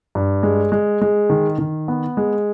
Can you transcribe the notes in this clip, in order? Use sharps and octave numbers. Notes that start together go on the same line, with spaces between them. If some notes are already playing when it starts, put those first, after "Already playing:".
G2
G#3
G#3
G#3
D#3
D#3
B3
G#3